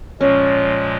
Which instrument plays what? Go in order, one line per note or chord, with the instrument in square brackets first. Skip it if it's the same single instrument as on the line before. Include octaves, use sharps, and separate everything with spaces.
[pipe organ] A#2 F3 G#3 [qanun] C#4